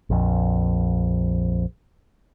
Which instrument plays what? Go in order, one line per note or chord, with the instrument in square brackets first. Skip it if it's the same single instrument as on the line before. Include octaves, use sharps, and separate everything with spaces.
[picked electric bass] A#1 F2